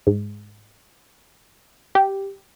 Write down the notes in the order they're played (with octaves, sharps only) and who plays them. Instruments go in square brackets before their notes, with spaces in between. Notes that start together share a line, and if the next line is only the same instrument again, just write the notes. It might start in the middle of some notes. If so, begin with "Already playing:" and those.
[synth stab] G#2
G4